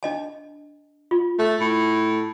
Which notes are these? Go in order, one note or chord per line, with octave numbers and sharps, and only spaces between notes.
D4 D#5 A5
F4
A3
A2